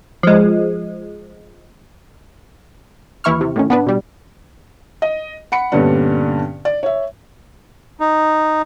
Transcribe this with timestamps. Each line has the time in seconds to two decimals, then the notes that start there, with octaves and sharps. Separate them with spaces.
0.23 F3 G#3
3.24 D#2 E3 E4 C#6 F6
3.41 C3
3.56 A2 D#3 C#4
3.70 B3 D4 B4
3.87 B2 G3
5.02 D#5
5.52 F#5 B5 C#7
5.72 G2 A#2 D3 B3 C#4 D4
6.65 D5
6.83 C#5 E5
8.00 D#4